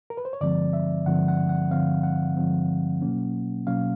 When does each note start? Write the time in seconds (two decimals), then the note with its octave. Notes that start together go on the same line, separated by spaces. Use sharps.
0.10 A#4
0.17 B4
0.25 C5
0.33 C#5
0.41 G2 D3 F3 G#3 C4 D5
0.73 E5
1.06 G2 D3 F3 G#3 C4 F#5
1.28 F#5
1.49 F#5
1.71 G2 D3 F3 G#3 C4 F5
2.03 F#5
2.36 G2 D3 F3 G#3 C4
3.01 B2 F#3 A#3 C#4
3.67 B2 F#3 A#3 C#4 F5